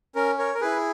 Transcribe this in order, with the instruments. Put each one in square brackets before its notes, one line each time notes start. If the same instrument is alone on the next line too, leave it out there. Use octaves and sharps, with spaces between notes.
[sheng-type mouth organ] C#4 A#4
A#4 C#5
A#4
E4 G#4 B4